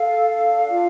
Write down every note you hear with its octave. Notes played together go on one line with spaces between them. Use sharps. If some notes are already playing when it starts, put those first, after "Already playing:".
Already playing: A4 F5
D4 F5
F4 F5